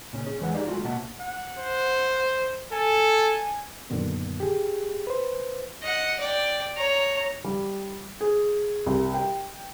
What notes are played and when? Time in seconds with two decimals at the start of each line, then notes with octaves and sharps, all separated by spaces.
0.13 A#2 C#3 C#4
0.26 C#4 G#4
0.41 E2 E3 G#3 B4 C#5 F#5
0.54 D#4 G4 G#4 D5 D#5 F5
0.67 D3 F#3 G#3 A3 F4 F#4
0.85 B2 A#3 C#4 E5 F#5 A5
1.20 F#5
1.59 C5
2.72 A4 G#5
3.90 F#2 A#2 D3 D#3 B3
4.40 G4 G#4
5.07 B4 C5
5.82 D#5 F#5
6.19 D5 G5
6.77 C#5 A#5
7.45 G3
8.21 G#4
8.86 C2
9.14 G5